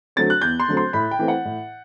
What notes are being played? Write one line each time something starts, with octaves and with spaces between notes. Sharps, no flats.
D3 F#3 A3 C4 A6
F#6
E2 G6
C6
D3 F#3 A3 C4
C6
A2 B5
G5
E3 A3 C4
F#5
A2